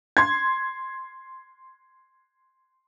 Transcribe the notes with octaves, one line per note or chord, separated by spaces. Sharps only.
C6 G#6